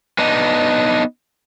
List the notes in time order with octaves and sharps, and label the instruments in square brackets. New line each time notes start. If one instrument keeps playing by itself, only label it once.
[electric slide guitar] B3 D4 D#4